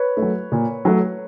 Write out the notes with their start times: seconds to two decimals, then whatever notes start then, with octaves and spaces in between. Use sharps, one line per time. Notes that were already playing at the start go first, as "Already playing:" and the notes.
Already playing: B4 C#5
0.17 A3
0.22 F#3
0.52 A#2
0.85 F#3 A3